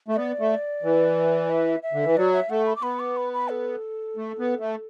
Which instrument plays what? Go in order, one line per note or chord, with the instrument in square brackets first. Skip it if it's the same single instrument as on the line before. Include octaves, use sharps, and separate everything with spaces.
[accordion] A3
[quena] E5
[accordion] B3 [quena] D5
[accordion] A3
E3
[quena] E5
E5
[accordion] D3
E3
[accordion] F#3 [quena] D5
[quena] E5
[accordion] A3 [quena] F#5
[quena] B5
D6
[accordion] B3 [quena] B5
[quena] D6
B5
B5
A4
[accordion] A3
B3
A3